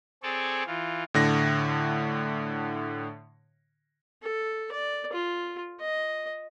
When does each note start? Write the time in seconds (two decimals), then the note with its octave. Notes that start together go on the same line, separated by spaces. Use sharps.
0.23 C4 G#4 A4 C#5 D5
0.67 E3 F4
1.14 A2 D3 A#6
4.23 A4
4.72 D5
5.13 F4
5.81 D#5